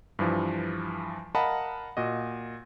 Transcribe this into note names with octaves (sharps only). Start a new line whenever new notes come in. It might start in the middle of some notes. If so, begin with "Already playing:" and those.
G2 E3 F3
A#4 D#5 F5 F#5 A5 B5
A#2 F#4 D#5